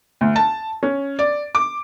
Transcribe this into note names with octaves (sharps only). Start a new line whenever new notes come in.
D2
A5
C#4
D5
D6